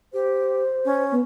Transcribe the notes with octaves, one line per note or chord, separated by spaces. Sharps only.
G4 C5
C#4
B3